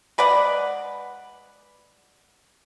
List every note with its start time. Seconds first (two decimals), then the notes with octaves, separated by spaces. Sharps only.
0.18 G#3 B4 D5 F#5